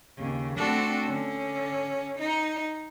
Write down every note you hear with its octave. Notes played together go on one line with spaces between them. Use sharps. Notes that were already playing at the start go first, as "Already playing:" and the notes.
D#2 C#3
A3 C4 D4 F#4 A4
D3 C#4
D#4